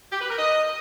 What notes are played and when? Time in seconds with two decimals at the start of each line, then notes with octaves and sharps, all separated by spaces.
0.12 G4
0.21 B4
0.29 A#4
0.38 D#5